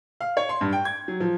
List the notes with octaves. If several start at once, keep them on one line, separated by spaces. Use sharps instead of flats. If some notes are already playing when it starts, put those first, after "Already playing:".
F5
C#5
C6
G2
G5
G#6
F#3
F3